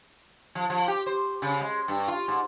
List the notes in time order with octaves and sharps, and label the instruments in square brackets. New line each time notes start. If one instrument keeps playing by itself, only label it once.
[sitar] F3
F3
G4
C5
C#3
G#3
G2
F4
G#2